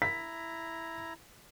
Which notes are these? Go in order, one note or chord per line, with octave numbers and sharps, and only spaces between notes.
E4 A#5 B6